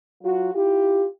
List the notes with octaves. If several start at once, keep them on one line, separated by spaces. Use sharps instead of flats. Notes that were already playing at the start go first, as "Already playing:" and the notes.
F#3 F4 F#4
E4 F4 G4